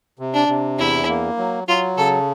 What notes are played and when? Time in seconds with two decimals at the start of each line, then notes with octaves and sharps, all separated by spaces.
0.19 C3
0.34 D4
0.48 C3
0.79 E2 E4
1.09 A#3
1.38 F#3
1.68 F#3 F4
1.97 C#3 A4